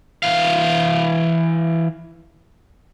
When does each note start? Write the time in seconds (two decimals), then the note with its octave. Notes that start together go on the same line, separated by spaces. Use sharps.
0.23 E3 F5